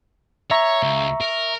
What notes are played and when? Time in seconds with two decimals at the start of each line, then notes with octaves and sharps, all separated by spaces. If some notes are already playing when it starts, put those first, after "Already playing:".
0.51 C#5 E5 A#5 C#6
0.83 C#2
1.21 A#4